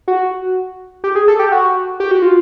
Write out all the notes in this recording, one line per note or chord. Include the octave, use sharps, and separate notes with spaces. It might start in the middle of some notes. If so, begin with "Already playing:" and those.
F#4
G4
G#4
A4
G4
F#4
G4
F#4
F4